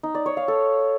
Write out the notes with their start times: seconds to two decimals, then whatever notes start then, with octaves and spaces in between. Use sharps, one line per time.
0.03 D#4
0.15 D5
0.26 C#5
0.37 F5
0.48 A4